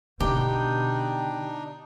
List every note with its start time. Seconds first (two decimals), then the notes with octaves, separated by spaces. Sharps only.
0.20 B2 D3 D4 D#4 G4 G5